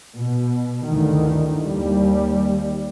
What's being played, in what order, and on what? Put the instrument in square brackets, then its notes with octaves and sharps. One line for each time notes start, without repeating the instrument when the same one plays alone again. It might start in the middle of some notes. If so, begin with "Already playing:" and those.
[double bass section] B2
D2 G2 D#3 E3
D#2 G3